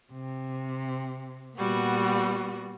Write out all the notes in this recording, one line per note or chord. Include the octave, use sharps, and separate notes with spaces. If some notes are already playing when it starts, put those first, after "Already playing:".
C3
A#2 G3 B3 F#4